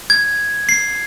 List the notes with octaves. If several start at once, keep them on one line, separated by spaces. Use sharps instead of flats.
G#6
C7